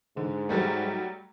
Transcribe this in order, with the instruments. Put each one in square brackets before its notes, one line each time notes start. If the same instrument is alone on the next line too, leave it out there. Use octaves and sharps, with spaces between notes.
[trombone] G#2 [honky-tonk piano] D3
[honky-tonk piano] F#3 G3 A3